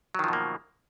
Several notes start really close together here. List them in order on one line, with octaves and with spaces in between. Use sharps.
F#3 D#3 F3 B2 A#3